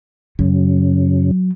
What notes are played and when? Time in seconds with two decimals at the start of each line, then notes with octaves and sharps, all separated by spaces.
0.39 F#2 C#3 F#3